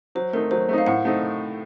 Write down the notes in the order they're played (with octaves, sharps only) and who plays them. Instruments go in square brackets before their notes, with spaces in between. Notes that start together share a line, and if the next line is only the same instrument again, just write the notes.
[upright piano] F#3 [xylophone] C5
[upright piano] A3 C4 D#4 [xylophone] A#4
[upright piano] F#3 [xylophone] C5
[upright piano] A3 C4 D#4
[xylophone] F5
[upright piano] A2 [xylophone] F#5
[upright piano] A3 C4 D#4